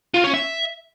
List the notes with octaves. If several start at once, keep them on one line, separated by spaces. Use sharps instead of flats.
F4
C#4
E5